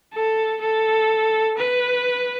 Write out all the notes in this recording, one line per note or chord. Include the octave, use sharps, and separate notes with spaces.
A4
A4
B4